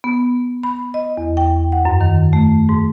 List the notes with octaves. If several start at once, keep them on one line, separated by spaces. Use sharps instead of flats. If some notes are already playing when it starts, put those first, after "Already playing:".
B3
B5
D#5
E2
G5
F#5
F#2
D#3
A3
G#2